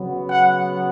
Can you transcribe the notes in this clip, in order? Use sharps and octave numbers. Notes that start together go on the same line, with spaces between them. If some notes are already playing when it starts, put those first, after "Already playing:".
Already playing: C#3 F#3 B3
F#5